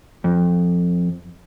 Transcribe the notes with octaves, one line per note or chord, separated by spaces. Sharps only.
F2